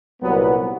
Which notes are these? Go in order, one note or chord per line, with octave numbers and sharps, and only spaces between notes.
C2 A#2 F#3 B3